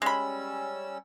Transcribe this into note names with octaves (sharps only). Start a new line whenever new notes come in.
G3 G#3 C#4 B5 E6